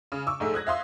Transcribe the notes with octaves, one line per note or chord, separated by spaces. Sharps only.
C#3
C#6 D6 E6
A#1 G#2 G#3 A3
D#6 F#6 G#6 A#6
E5 F5 C6 D#6